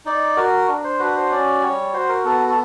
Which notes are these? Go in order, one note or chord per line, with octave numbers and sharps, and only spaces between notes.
D#4 D5
F#4 A#4
D4
C5
F#4 B4
C5
C#4 D5
G3 C#5
F#4 C5
A#4
B3 A4
A4